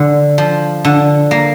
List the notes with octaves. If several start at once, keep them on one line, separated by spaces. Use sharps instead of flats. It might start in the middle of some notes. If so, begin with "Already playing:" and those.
Already playing: D3
F3
D3
A#3